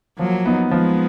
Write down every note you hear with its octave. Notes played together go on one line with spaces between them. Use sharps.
F3 F#3 A#3
B3 D#4
F3 G#3 B3